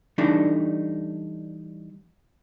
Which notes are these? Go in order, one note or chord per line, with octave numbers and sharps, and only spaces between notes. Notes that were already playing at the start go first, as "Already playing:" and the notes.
E3 G3 A3 D4 D#4